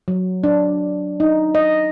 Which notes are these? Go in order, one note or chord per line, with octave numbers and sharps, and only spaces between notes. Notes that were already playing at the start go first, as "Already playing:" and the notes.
F#3
D4
D#4
D#5